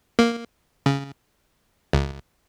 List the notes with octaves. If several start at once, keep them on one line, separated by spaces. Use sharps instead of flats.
A#3
C#3
C#2